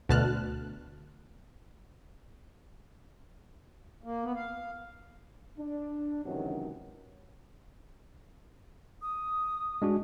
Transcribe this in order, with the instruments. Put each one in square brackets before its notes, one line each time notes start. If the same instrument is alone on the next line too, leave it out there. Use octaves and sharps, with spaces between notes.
[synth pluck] D2 B2 A5 F6 F#6
[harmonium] A#3
B3
F5
[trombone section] D4
C#2 F#2 C3 D#3 E3 F#3
[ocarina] D#6
[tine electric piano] G#3 D4 F#4